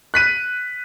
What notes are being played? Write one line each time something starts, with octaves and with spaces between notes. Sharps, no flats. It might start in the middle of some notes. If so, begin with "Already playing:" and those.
F#6 B6 D#7